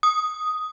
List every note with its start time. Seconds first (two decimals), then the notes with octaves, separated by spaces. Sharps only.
0.03 D#6